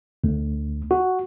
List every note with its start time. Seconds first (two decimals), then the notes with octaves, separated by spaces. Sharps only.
0.24 D2
0.91 F#4